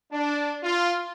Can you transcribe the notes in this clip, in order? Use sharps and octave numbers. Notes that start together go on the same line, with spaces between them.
D4
F4